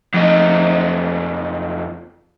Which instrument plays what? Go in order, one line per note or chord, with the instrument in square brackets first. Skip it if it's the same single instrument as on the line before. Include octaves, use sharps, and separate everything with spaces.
[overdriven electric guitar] F2 D#4